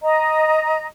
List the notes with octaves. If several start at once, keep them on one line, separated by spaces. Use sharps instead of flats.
D#5 A#5